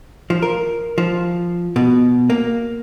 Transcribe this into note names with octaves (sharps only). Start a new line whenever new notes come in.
F3
A#4
F3
B2
A#3